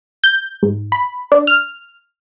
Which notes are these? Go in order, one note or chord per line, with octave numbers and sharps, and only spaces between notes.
G6
G#2
B5
D4
F6